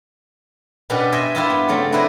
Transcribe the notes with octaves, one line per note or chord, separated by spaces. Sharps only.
B2 B3 C#4 D4 F#4 G4
C5 D#5 E5 G5 G#5 C6
G2 E4 F4 G4 B4 E5
B3
C#3 F#3 A3 C4
D4 E4 B4 C5 D#5